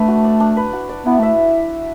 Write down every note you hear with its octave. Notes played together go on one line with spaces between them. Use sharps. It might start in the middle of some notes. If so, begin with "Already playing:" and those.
Already playing: A3 D4 B4
F#4
D5
D4
B4
F#4
D5
B3 E4
A3 E5